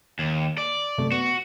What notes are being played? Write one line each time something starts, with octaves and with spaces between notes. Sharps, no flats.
D#2
D5
F#2 C3 A3
B3 F#4